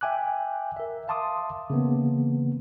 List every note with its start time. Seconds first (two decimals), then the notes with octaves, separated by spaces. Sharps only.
0.01 E5 G5 G#5 D6 F#6
0.77 A#4 E5
1.08 E5 F5 A5 C6 D6 D#6
1.70 C#3 E3 A#3 B3